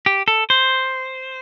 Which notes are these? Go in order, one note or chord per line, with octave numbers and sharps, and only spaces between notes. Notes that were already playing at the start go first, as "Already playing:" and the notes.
G4
A4
C5